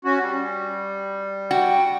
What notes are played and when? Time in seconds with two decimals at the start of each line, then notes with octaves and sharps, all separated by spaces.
0.05 C#4 F#4
0.20 G3
1.51 F#4 G5